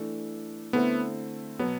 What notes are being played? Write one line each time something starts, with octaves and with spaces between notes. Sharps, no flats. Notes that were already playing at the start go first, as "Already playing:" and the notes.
Already playing: E3 A3 D4 A4
D3 A3 B3 C4 E4
B2 F#3 B3